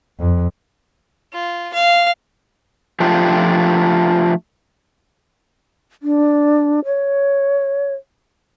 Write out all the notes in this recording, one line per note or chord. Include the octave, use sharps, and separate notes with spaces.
F2
F4
F5
F3 A3 D4 F4 G4
D4
C#5